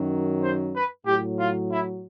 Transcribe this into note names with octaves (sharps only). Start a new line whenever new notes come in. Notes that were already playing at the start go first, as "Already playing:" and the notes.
Already playing: F#2 D#3 F#3
C5
B4
A2 F#3 G4
F4
E4